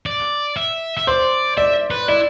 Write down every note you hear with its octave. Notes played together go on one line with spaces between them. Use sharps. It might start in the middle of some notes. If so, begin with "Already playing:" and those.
D5
E5
E5
C5 D5
D5 E5
B4
E4 D5